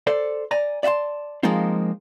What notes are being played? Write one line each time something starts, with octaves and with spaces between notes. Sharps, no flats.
A4 C5 D5
D5 G#5 A#5
D5 E5 F#5 A5 C6
F3 G#3 A#3 C4 D#4 F4